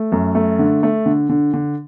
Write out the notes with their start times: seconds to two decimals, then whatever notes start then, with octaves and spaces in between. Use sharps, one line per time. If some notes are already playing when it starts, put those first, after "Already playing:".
Already playing: A3
0.12 F#2
0.35 A3
0.59 D3
0.83 A3
1.06 D3
1.29 D3
1.53 D3